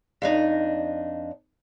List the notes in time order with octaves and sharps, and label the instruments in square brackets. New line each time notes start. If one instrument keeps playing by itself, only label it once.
[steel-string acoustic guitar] F2 D4 D#4